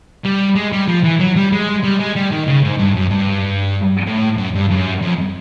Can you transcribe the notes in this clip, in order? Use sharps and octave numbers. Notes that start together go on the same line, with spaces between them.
G3
G#3
G3
F3
E3
F#3
G3
G#3
G3
G#3
G3
D#3
C#3
G#2
G2
F#2
G2
A2
F#2
G2
F#2
F2